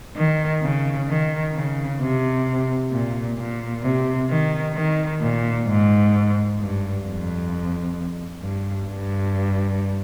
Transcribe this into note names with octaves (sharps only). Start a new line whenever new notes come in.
D#3
C#3
D#3
C#3
C3
A#2
A#2
C3
D#3
D#3
A#2
G#2
G2
F2
G2
G2